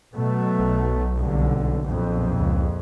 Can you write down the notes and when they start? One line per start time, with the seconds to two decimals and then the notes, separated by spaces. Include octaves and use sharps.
0.14 B2 F#3 A3
0.60 B1
1.16 C2 D3
1.84 A#1 F2
2.40 C#2